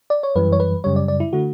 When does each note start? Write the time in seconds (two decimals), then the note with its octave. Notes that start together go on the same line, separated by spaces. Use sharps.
0.10 D5
0.23 C#5
0.36 F#2 E3 G3 B4
0.52 C#5
0.60 B4
0.84 F#2 C#3 G3 C#5
0.96 D5
1.08 D5
1.20 E4
1.33 D3 A3 F#4